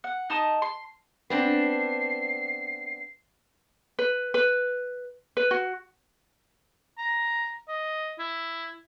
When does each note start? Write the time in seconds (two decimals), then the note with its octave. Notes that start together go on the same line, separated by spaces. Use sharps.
0.04 F#5
0.30 D#4 A5 D#6
0.62 C6
1.30 B3 C4 D4 C7
3.99 B4
4.34 B4
5.37 B4
5.51 F#4
6.98 A#5
7.69 D#5
8.19 E4